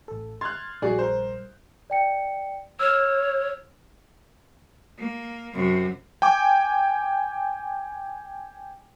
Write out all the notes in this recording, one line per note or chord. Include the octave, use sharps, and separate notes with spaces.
A1 A4
C6 F6 F#6 G#6 A6
A#1 G3 F#4 G#4 D5
A#4 C5
D5 G5 C#7
C#5 E6 F6 E7
A#3
F#2 C3
G5 G#5 D6